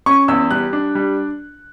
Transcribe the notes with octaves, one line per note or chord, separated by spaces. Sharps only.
C#4 C#6
E2 E6
G3 F#6
D4
G3